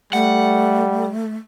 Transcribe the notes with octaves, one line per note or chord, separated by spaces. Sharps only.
G3 A3 F#5